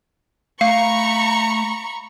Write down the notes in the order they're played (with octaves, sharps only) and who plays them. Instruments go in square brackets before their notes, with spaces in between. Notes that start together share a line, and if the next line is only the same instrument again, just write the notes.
[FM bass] A3 [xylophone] F5 [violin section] A#5 B5 C#6